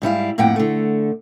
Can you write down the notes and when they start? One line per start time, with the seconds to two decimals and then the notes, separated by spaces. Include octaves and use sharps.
0.02 G#2 G3 E4 F5
0.38 F2 A2 A#3 F#5 G5
0.56 D3 A3